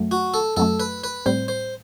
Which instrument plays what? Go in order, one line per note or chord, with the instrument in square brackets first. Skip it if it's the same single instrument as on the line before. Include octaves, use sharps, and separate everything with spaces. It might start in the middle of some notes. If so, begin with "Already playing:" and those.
Already playing: [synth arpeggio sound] F#2 F#3 A3
[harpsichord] F#4
A4
[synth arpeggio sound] F#2 F#3 A3 [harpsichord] A4
[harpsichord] B4
B4
[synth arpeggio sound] A2 G3 C4 [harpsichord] C5
[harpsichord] C5